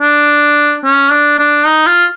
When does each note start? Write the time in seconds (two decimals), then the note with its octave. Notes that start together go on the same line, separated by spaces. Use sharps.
0.02 D4
0.84 C#4
1.11 D4
1.39 D4
1.66 D#4
1.87 F4